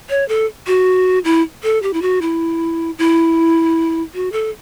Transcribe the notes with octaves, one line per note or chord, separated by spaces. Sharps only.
C#5
A4
F#4
E4
A4
G4
E4
F#4
E4
E4
F#4
A4